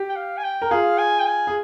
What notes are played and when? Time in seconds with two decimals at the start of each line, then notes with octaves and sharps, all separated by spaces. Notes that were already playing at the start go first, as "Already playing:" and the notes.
Already playing: G4
0.09 G5
0.16 F5
0.37 G#5
0.44 G5
0.62 A#4
0.71 F4 G#4 F5
0.99 G#5
1.20 G5
1.26 G#5
1.47 G#4